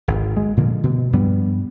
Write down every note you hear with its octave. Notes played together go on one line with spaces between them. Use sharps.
G#1
G#3
A#2 D3 F3 A#3
B2
G2 F3 G3 B3